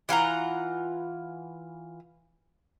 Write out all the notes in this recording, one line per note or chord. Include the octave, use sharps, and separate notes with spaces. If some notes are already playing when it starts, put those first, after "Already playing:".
E3 F4 F#5 A#5